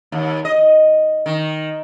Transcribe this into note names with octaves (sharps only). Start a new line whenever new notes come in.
D#2
D#5
D#3